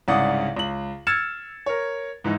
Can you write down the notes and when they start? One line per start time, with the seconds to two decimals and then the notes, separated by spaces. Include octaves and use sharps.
0.08 C2 G#2 C#3 D5 F#5 D#6
0.57 C#2 F#7
1.07 E6 F6 G#6 A6 C#7 E7
1.66 A#4 C#5
2.24 G#2 E3 D#4 E4